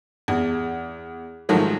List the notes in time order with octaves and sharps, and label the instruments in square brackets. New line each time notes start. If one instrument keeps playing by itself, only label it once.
[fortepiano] E2
G#2 D#3 F3 F#3 A3